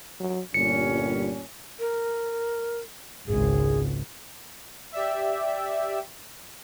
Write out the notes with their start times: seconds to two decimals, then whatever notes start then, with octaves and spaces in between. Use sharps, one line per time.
0.20 F#3
0.54 G1 A#2 G3 C#4 C#7
1.79 A#4
3.27 G#1 C#2 G#4
4.92 G4 D5 E5